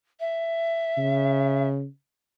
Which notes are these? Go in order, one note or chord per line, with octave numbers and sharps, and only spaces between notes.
E5
C#3